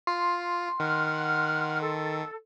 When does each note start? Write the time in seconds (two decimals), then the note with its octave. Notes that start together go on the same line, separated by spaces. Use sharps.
0.07 F4 C6
0.80 D#3 F#5 F6
1.82 A4